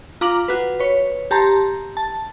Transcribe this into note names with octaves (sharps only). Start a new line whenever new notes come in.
F4 A#5 D6 F6 F#7
F#4 B4
B4 C#5
G4 A5 A#5 C6
A5